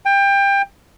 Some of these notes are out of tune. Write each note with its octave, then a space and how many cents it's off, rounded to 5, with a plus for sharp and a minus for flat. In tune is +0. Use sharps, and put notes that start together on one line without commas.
G5 +25